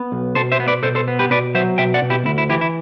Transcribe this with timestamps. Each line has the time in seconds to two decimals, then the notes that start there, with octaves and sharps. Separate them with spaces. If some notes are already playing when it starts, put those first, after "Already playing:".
Already playing: B3
0.12 B1
0.35 B2 A4 C5
0.52 C5 E5
0.60 B3
0.68 B4 D5
0.83 B2 A4 C5
0.95 A4 C5
1.08 B3
1.19 G4 B4
1.31 B2 B4 D5
1.55 F#3 C5 E5
1.78 B2 E5 G5
1.94 D5 F#5
2.02 B2
2.10 E4 G4
2.25 D2 E4
2.38 E4
2.49 E3 E4 G4
2.61 E4